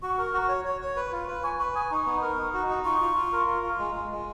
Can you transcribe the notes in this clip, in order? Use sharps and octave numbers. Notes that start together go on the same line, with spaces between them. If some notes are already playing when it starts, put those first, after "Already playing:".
F#4 C#6
A#4
F#4
C#5
C#5
C#5
B4
F4
B4
G#5 C#6
B4 C#6
G#5 D#6
D#4 C#6
B3
A#4
D#4
F#4
D#4
F4 C#6
F4
F4
A#4
F4
F4
G#3
G#3
G#3